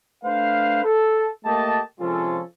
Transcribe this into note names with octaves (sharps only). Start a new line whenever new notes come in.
A3 D4 B4 C5 F5
A4
A3 A#3 G4 D#5 A5
C3 F3 G#3 C#4 F4 A4